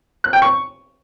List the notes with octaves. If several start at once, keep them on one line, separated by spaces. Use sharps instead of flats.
F#6
G5
C#6